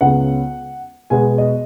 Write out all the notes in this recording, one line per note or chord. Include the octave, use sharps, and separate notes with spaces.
C#2 C#3 B3 F#5
B2 G#3 B3 G#5
D#5